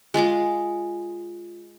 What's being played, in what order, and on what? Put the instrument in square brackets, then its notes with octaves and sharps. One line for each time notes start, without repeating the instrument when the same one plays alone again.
[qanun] G#3 F4 G#4 D6